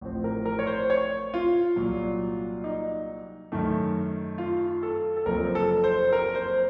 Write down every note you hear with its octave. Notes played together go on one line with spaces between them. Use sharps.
A1 A2 F3 C4
A#4
A#4
C#5
C5
C#5
F4
C2 A#2 F#3
D#4
F#2 D#3 A3
F4
A4
A4
F#1 F#2 F3 C4 A#4
A4
C5
A#4
C5